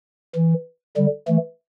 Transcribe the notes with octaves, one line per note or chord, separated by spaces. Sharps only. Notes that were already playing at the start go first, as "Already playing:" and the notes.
E3
D3 G3
E3 A3